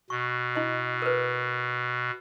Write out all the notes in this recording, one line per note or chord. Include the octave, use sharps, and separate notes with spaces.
B2 C#6
E4 D#5
A#4 B4